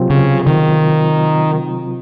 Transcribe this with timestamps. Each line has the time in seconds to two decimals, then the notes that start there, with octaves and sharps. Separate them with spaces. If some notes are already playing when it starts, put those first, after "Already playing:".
Already playing: C3 F#3 C4 F4
0.10 C#3
0.47 D#3